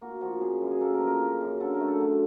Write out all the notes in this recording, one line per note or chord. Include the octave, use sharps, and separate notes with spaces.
A#3 F#4
F3 F#4
C#3 G#4
F#2
G#4
A#3 A4
A#4
F3
A#4
C#3
F#2
D3 A4
A#4
A3
A4
F#3